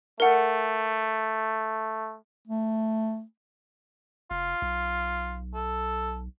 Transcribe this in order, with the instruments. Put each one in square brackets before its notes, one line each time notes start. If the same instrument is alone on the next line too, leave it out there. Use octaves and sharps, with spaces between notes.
[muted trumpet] A3 [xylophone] A#4 F#5
[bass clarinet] A3
[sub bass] F1 [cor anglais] F4
[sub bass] B1
[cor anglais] A4